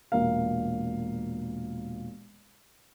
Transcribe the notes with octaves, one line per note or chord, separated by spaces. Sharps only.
E1 A#2 A#4 F5